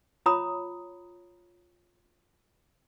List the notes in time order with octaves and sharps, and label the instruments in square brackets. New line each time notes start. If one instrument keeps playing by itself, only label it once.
[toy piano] F4 C#5 A#5 B5 D#6